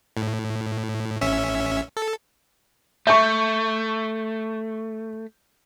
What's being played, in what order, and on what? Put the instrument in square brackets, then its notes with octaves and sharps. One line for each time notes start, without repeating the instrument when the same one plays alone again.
[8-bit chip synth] A2
A1 C#4 E5
A4
[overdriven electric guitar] A3 [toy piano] E5 A5 [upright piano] C#6 G6